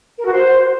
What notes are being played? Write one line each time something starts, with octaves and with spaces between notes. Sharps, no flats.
A#4
F#4
C5